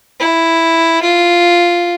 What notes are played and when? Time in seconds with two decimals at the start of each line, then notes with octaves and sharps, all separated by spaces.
0.19 E4
1.02 F4